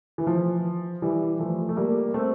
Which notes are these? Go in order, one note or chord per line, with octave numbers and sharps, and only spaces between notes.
E3
F3
E3 G3
F3 A3
A3
G3 A#3
A3 C4